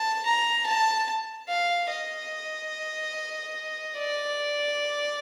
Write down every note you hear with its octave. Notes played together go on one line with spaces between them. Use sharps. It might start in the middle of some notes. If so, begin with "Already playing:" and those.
Already playing: A5
A#5
A5
F5
D#5
D5